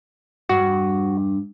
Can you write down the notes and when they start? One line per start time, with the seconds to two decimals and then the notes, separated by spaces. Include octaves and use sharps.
0.49 E2 G2 F#4